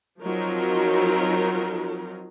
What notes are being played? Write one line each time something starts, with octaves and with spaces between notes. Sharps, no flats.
F3 F#3 C4 D#4 F4 A#4